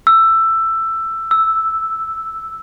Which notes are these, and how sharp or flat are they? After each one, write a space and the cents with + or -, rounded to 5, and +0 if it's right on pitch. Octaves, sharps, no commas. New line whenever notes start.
E6 +10
E6 -5